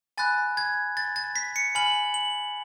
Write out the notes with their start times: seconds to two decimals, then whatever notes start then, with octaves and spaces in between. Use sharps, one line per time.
0.18 G#5 B5 F#6 A6
0.57 G#6
0.97 A6
1.16 A6
1.36 B6
1.56 C#7
1.75 G#5 B5 F6 F#7
2.14 F#7